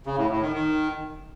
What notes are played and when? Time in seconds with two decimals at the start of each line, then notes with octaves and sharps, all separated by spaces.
0.06 C#3
0.18 A2
0.30 A2
0.41 D#3
0.53 D#3